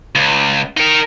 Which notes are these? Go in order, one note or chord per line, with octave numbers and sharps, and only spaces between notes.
C#2
D#4 A#4